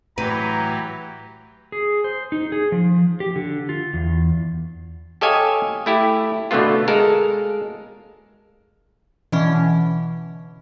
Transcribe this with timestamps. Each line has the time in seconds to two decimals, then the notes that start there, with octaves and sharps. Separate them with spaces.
0.18 A2 E3 F#3 G4 B4 A#5
1.72 G#4
2.04 C5
2.32 D#4
2.52 G#4
2.72 F3
3.20 G4
3.36 D3
3.69 F4
3.93 E2
5.21 G4 A4 C#5 D#5 F5 G#5
5.86 A3 E4 G4
6.51 B2 D3 A3 B3 F4
6.88 G#3 A4 A#4 F5
9.32 B2 D3 E3 C#4